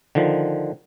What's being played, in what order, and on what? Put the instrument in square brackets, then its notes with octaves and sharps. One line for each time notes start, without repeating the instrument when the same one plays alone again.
[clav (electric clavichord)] D3 D#3 F3